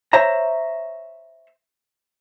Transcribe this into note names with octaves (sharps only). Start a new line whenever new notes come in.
C5 C#5 E5 A#5